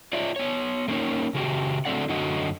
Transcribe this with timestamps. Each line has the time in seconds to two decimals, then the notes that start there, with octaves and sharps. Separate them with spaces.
0.13 F4 C#5 D5 E5
0.36 B3 C#5
0.88 A3 A#3 C#4 D#4 A#4 C#5
1.35 C#3 F#4 G4
1.85 D3 F#3 A3 C4 D5 F#5
2.09 F#2 D3 F#3 F#4 D#5